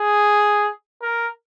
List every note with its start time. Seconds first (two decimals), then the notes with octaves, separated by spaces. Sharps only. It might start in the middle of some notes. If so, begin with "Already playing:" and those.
Already playing: G#4
1.02 A#4